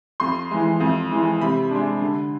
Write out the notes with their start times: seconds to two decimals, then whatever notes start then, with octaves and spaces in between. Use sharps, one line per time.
0.20 F2 C6
0.51 E3 G#3
0.80 F2
1.11 E3 G#3
1.41 C3 B5
1.71 G#3 D4
2.02 D3